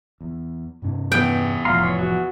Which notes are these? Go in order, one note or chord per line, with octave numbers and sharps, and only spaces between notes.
E2
G2 C3 C#4
E2 B3 G5
F1 A2 F3 F5 A#5 C6
C#5
F#4